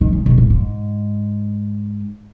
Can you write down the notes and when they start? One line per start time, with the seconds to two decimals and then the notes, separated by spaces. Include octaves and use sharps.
0.01 D#3
0.13 C#3
0.26 B2
0.38 A2
0.50 G#2